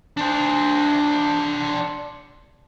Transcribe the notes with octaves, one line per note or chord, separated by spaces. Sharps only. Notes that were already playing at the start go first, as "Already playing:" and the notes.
D4 C5